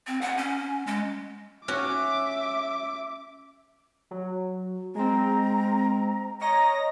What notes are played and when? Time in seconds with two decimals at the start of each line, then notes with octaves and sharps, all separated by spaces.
0.07 C4
0.21 F#5
0.37 C#4
0.87 G#3
1.68 C#4 F#4 E5 D6
4.11 F#3
4.95 G#3 C4 A#5
6.41 C#5 D#5 A#5 A#6